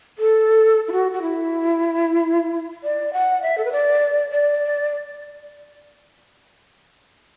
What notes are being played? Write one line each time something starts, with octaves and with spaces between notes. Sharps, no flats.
A4
E4
F#4
F#4
E4
D5
F#5
E5
A4
B4
D5
D5